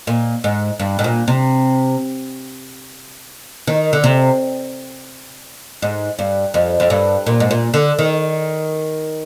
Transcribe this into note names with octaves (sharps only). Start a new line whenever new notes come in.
A#2
G#2
G2
G#2
A#2
C3
D#3
D3
C3
G#2
G2
F2
F2
G2
A#2
G#2
A#2
D3
D#3